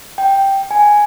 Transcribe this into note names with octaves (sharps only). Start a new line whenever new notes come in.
G5
G#5